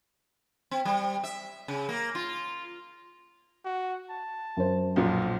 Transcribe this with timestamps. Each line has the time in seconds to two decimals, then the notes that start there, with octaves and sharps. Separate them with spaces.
0.71 C4
0.85 G3
1.24 E5
1.68 C#3
1.89 A#3
2.15 F4
3.65 F#4
4.10 A5
4.57 F#2 C5
4.96 B1 A#2 F3 F4